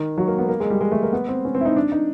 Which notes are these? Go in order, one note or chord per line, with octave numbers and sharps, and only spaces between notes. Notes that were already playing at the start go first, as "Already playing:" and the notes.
Already playing: D#3
F#3
A#3
B3
A#3
G#3
G3
G#3
A3
A#3
B3
C4
C#4
C4
E4
D#4
D4
D#4